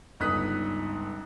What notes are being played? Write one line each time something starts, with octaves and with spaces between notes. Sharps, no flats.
G1 C#2 D#4 D#6 F#6 B6